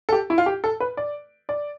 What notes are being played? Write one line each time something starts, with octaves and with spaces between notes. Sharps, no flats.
A4
G4
E4
F4
G4
A4
B4
D5
D5